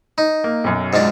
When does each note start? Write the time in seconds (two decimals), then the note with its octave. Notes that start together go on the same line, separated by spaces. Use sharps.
0.18 D#4
0.44 A#3
0.64 B1 F#2
0.93 G#2 F3 D4